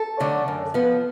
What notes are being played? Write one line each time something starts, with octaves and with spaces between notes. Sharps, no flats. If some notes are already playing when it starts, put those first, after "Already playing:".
Already playing: A4
D3 F#3 A3 D4
F#2
F3 B3